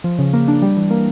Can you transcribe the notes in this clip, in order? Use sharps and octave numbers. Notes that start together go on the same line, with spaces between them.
F3
C#3
A#3
D4
G3
E3
A#3